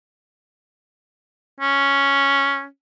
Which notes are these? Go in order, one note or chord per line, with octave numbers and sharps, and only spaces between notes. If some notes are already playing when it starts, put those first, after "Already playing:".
C#4